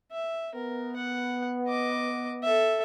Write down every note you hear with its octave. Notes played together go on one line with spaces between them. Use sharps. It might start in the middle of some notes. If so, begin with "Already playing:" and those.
E5
B3 A#4
F#5
D#5 D6
A4 E5